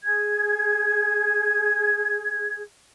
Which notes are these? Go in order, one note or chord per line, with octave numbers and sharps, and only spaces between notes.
G#4 G#6